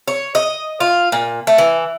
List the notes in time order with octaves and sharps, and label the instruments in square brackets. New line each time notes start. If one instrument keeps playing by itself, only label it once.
[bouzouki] C#5
D#5
F4
A#2
A3
E3